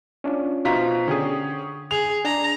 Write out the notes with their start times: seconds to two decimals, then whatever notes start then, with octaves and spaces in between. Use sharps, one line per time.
0.24 C#4 D4 F4
0.65 B2 D#4 F4 C5 A#5 B6
1.08 D3 C#4 G4 G#4 D#6
1.91 G#4 F7
2.25 D4 A#5